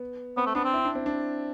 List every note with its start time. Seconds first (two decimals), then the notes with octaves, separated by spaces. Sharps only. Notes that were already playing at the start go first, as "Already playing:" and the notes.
Already playing: B3
0.37 B3 C4
0.46 A3
0.55 B3 D4
0.64 C4
0.74 E4
0.85 D4
0.95 C4
1.06 D4